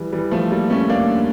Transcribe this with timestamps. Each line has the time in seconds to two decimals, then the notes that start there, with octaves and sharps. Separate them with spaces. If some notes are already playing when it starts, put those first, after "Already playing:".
Already playing: E3 G3
0.12 E3 G3
0.31 F3 A3
0.51 G3 A#3
0.70 A3 C#4
0.89 A#3 D4